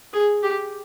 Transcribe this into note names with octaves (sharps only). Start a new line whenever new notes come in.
G#4
G4